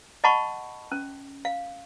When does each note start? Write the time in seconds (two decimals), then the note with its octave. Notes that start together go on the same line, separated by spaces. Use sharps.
0.24 D#5 F#5 A5 B5 C#6
0.92 C#4
1.45 F5